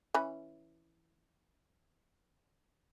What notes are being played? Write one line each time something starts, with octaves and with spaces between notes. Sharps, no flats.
E3 C#4 B5